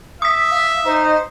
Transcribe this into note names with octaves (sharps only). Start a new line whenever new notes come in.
E5 D#6 B6
F5
D#4 C5